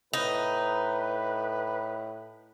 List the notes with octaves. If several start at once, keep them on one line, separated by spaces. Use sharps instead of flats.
A2 D#4 B4